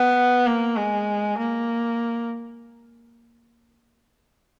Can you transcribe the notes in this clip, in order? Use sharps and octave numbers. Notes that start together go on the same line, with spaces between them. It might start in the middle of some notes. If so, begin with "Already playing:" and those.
Already playing: B3
A#3
G#3
A#3